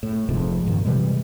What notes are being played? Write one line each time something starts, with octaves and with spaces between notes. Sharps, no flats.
A2
F1 F2 G#2 C3
G2 A#2 D#3
C3 E3 G3 G#3